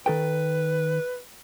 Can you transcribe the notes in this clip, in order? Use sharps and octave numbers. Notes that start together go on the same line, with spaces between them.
D#3 A4 B4 G5